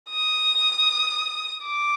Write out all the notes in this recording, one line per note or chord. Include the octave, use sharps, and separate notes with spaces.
D#6
D6